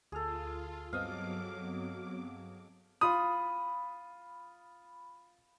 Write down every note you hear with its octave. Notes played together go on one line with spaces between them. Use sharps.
D2 F4 G#4 A4 F6
G2 F#3 B3 C4 D#5 F5 D6
F4 B5 D#6